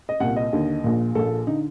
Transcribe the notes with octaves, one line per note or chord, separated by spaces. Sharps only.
D#5
C2 A#2 F#5
D#5
D#2 D3
A#1 A#2
A#1 A#2 A4
D3 D#4